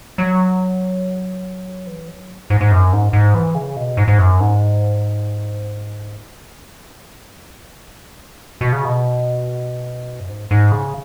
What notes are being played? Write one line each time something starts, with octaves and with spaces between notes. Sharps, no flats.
F#3
E3
F#3
G#2
G#2
F#2
G#2
G#2
E3
C#3
B2
G#2
G#2
F#2
G#2
B2
C#3
B2
F#2
G#2
G#2
C#3